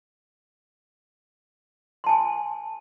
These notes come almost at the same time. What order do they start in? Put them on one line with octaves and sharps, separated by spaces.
C6 A5 G#5